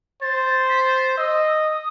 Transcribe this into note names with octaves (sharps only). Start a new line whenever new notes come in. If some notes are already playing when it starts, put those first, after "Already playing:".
C5 A6
A6
B6
A6
D#5 E6
D#6